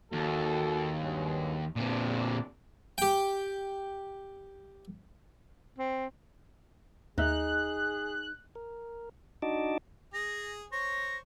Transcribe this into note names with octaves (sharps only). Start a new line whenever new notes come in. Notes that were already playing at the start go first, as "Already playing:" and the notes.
D#2 F#4 A4
G2 F#3 G#3
E2 A#2 C4 D4
G4 G5
C4
D#2 D#4 G#4 E5 F#6
A#4
D4 D#4 F#4 D#5 A5 D6
G#4 G#5 A#6
C5 C#5 C#6 A#6